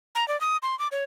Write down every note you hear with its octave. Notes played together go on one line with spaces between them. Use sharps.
A#5
D5
D#6
C6
D6
C#5